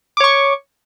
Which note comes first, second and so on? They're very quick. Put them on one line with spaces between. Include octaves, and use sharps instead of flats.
D6 C#5 C#6